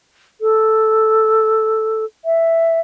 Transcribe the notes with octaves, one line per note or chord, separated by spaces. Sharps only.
A4
E5